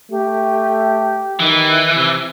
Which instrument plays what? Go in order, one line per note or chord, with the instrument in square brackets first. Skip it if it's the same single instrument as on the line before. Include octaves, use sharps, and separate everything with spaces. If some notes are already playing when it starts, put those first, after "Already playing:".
[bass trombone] A3 [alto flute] G4
[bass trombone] D#3 [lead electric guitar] E3
[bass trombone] C3